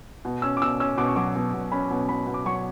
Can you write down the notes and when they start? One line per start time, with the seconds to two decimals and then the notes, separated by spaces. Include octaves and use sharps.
0.25 B2
0.42 C#4 E6
0.57 D6
0.62 B2 E6
0.80 C#4 E6
0.98 B2 D6
1.08 C#6
1.16 F#3 D6
1.36 B2
1.53 B2
1.72 C#4 B5
1.91 B2
2.09 B2 B5
2.27 B2
2.34 D6
2.45 F#3 C#6
2.56 C#6